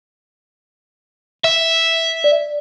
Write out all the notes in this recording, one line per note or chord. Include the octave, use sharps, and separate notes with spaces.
E5
D5